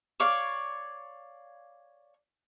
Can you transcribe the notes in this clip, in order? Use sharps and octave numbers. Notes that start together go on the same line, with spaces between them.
C#5 D5 F5